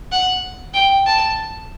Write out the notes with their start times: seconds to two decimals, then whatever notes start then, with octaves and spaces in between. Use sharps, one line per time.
0.12 F#5
0.74 G5
1.06 A5